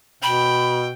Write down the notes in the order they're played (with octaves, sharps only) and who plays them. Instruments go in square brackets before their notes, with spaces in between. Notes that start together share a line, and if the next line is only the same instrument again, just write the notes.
[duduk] B2 [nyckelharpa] G5 [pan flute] B5